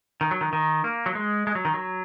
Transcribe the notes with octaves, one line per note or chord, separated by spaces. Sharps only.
D#3
F#3
D#3
D#3
A#3
F#3
G#3
G#3
F#3
D#3
F#3